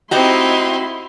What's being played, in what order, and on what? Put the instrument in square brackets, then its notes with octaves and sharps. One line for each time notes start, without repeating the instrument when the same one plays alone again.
[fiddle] C4 D#4 [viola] E4 C6 [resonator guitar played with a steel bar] F#4 G4 G5 [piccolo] D#5